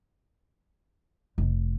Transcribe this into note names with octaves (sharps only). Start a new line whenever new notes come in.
F1